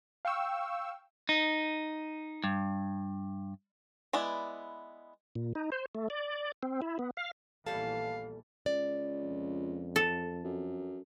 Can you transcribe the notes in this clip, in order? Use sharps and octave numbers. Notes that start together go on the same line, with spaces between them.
F5 G5 C#6 E6
D#4
G2
G#3 B3 E4 D5
A#2
D#4
C5
A3
D5
C4
E4
B3
F5
A#1 E2 A#2 E3 G3 A4 F5 A5
C#2 D5
F2
A4
F#2